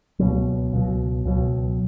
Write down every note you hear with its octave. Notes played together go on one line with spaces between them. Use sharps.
C#2 B2 F#3
C#2 B2 F#3
C#2 B2 F#3